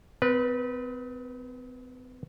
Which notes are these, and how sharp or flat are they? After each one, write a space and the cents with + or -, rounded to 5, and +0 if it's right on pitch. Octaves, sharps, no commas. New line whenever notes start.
C4 -45 B4 -20